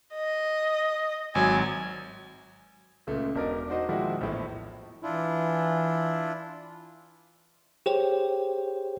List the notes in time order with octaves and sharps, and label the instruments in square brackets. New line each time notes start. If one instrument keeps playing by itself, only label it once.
[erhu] D#5
[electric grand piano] G#1 F#3 [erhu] G#5
[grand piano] C#2 A#2 C#3 A3
E1 D4 A#4 D5 D#5
D4 D#4 F#4 C5 D#5
A#2 D#3 F3 G#3 E4 F#4
A#1 E2 A2 F3
[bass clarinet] E3 [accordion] D4 E4 F4
[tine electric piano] G4 G#4 C5 C#5 G5